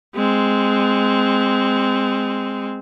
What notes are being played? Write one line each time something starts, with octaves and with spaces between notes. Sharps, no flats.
G#3 C4